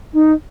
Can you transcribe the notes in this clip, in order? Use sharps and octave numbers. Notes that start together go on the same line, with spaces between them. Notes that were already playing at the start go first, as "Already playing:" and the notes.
D#4